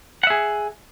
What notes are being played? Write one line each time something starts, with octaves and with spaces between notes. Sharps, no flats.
G#4 E5 F#5